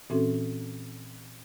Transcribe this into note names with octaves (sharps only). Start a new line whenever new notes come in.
A#2 E3 C4 C#4 F#4 A4